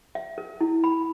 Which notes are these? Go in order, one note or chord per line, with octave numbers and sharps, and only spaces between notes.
E5
A#4
E4
B5